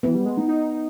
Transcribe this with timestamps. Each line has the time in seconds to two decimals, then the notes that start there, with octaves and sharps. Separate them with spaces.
0.03 E3 B3
0.15 G3
0.26 G#3
0.38 D#4
0.48 D#4